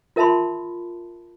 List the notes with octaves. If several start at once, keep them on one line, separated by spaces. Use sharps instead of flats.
F4 A#4 E5 A5 B5 C6